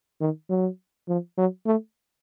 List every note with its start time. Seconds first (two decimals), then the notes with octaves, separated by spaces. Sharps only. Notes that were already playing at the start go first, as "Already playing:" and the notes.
0.21 D#3
0.50 F#3
1.08 F3
1.37 F#3
1.66 A3